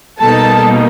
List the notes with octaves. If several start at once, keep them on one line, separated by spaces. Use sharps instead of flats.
B2 G3 A#3 D#4 A4 A5